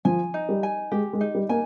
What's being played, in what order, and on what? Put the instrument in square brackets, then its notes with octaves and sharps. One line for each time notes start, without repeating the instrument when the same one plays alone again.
[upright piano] F3 [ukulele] G#5
[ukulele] D#4
[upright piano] G3
[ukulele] G#5
[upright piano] G#3 [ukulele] G4
[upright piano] G#3
[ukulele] D#4
[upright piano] G3
[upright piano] A#3 [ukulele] G#5